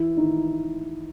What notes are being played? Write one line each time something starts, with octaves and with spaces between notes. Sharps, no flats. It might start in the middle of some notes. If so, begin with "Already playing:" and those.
Already playing: E3 E4
D#3 D#4